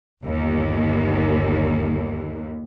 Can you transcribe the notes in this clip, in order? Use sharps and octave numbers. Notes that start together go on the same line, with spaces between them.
G1 D#2